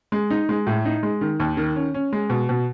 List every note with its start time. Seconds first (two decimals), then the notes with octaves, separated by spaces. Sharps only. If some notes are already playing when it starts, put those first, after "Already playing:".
0.12 G#3
0.30 D#4
0.49 G#3
0.67 A2
0.85 D#4
1.03 G#3
1.21 D#3
1.40 D#2
1.57 D#3
1.76 C#4
1.94 C#4
2.13 G#3
2.30 B2
2.49 B2